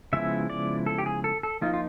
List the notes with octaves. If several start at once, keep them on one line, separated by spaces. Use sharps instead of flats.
C#3 F3 G#3 B3 E4 E5
D5
A4
G4
G#4
A4
A4
F3 A#3 D#4 F4
F4